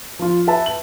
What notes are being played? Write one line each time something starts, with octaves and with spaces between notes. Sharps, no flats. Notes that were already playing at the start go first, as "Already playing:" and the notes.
F3 F4
B4 E5 A5
F#7